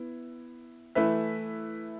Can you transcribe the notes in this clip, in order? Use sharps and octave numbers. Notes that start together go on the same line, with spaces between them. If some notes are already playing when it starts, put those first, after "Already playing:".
Already playing: B3 E4
E3 A3 E4 B4 E5